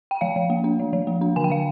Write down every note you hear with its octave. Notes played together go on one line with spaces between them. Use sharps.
G5
F3 F5
F3
A#3
D4
F3
F3
A#3
D4
D3 G#5
G5
D3 F5